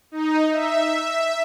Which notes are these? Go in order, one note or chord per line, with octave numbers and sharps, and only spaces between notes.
D#4
E5